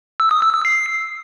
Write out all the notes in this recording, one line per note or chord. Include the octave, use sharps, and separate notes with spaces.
E6
D#6
E6
E6
C7